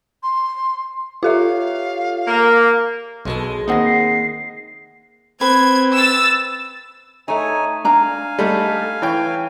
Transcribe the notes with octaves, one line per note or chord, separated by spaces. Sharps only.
C6
F4 G4 A4 C#5 E5 F5
A#3
B1 B2 G#3 A4
D#3 A#3 C4 D#4 F#5 D#6 A#6
C7
C4 B4 G#6
E6 A6
A3 D#4 C#5 G#5
D4 F5 G#5 A#5
G3 A3 D#4 A4
E3 C#5 G5